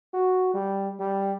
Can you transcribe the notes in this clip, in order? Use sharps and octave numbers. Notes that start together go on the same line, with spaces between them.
F#4
G3
G3